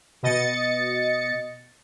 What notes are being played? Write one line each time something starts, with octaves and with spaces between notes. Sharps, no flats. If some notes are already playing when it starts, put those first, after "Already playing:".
B2 D#5 A6 C#7